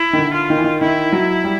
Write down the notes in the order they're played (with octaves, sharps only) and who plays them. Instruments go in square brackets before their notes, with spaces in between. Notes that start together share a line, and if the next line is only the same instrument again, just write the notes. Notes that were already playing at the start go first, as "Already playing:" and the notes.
Already playing: [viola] E4
[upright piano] D#3
D3
[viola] F4
[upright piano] D#3
E3
D#3
[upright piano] D#3 [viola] E4
[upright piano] F#3
G3